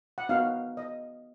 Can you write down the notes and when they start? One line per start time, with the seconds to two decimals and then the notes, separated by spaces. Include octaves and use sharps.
0.18 F#5
0.29 B3 D#4 F#4 F5
0.77 D#5